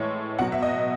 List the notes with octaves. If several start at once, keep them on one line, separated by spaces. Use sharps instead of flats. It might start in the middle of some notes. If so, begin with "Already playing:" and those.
Already playing: A2 E3 G#3 C#5
B2 F#3 F#5
E5
D#5